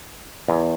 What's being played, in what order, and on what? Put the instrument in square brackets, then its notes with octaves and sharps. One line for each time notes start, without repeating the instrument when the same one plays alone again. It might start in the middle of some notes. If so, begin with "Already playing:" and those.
[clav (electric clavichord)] E2